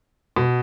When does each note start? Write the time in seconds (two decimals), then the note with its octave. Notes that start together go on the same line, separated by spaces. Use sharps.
0.36 B2